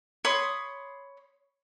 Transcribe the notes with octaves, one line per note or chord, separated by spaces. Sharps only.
C#5 B5 C6 D#6